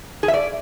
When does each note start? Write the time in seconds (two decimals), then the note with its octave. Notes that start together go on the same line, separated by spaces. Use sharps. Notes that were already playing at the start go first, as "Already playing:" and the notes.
0.23 G#4
0.28 E5
0.34 D5